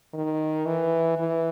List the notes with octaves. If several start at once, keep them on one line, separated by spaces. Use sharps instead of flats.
D#3
E3
E3